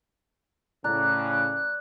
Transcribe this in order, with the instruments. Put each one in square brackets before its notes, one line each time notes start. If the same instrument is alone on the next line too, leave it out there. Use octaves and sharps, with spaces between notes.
[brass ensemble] A2 C#3 [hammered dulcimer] D5 A#5 [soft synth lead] F#6